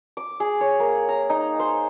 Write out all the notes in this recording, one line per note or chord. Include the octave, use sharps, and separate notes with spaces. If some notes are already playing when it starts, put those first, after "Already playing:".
D6
G#4
C#5
A#3
A#5
D#4
C5